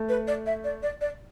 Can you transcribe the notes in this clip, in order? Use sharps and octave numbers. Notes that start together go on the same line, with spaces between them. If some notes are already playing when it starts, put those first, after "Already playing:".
Already playing: A3
B4
D5
E5
D5
D5
D5